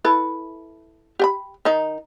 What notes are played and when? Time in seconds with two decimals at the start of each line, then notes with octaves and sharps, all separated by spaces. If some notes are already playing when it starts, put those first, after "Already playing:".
0.04 E4 A4 B4
1.19 G4 G5 B5
1.65 D#3 D#4